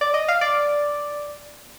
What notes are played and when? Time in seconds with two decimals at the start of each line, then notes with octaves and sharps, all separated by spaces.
0.01 D5
0.14 D#5
0.28 F5
0.41 D5